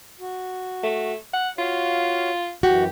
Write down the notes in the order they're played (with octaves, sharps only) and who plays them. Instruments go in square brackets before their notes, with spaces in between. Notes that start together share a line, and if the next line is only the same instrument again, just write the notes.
[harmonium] F#4
[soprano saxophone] A3
F#5
[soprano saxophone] F4 [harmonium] F#4 C#5 F5
[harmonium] F#2 E3 [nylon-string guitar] F#4 [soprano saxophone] G4